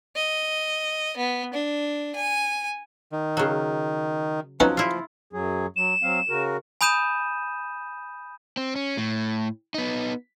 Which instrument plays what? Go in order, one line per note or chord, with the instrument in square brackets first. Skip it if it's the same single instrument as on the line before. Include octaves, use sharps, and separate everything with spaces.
[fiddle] D#5
B3
D4
G#5
[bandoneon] D#3
[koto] C#3 F#3
[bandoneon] F3 [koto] F#3 [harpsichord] B3 C#4 D#4
[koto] E4 F4
[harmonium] F#2 F#3 G#4
[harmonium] F#3 [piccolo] E7
[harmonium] F#3 C4 F5
C#3 F#4 A#4
[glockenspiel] G#5 B5 D#6 G6 D#7 E7
[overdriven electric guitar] C4
C#4
A2
B3 D#4